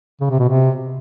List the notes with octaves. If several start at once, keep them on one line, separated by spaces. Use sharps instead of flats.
C#3
C3
B2
C3